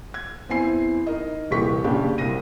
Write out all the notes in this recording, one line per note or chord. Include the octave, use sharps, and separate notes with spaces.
G#6
E2 C4 E4 G#5 C7
D#4 A#4 D#5
D#1 C2 E3 G4 C#6 B6
F#1 C#3 D4 G4
C2 C3 A#6 D#7